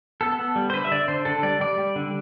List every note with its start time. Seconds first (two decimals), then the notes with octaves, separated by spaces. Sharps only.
0.21 B3 A4
0.39 B3
0.56 G3
0.70 C5
0.74 D3 B4
0.85 E5
0.92 D3 D5
1.08 D3 C5
1.25 D3 A4
1.43 G3 D5
1.60 G3 D5
1.78 G3
1.96 D3